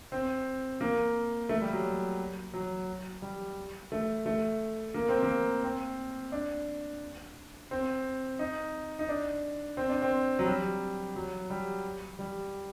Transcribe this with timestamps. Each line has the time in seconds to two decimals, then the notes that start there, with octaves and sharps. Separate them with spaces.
0.12 C4
0.81 A#3
1.49 A3
1.62 G3
1.73 F#3
2.53 F#3
3.22 G3
3.92 A3
4.26 A3
4.94 A#3
5.09 C4
5.23 A#3
5.64 C4
6.32 D4
7.71 C4
8.39 D#4
8.99 D#4
9.09 D4
9.77 C4
9.90 D4
10.02 C4
10.39 F#3
10.46 G3
11.16 F#3
11.50 G3
12.19 G3